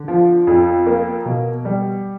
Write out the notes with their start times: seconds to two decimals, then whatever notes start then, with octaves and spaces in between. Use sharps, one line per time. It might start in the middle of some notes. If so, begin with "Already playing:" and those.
Already playing: D3
0.08 F3
0.47 F2
0.86 A#3
1.26 B2
1.65 G3